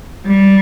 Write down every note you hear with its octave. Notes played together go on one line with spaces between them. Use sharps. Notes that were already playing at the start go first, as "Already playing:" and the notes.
G3